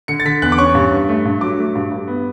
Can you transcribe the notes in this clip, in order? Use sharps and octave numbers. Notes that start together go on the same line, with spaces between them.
D3 C#7
A6
D3 B6
E2 F#6
D6
C#4 C#6
G2
G2
A3
G2
F#3 D6
A3
G2
G2
B3